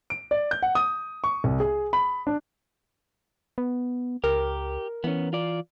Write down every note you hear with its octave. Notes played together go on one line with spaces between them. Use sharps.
D7
D5
G6
F#5
D#6
C#6
C2
G#4
B5
D4
B3
C#2 G4 A#4
E3 B3 C#4
F4 D5